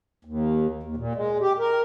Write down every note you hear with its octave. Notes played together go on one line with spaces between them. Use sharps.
D#2
D#2
A#2
G#3
G4
A#4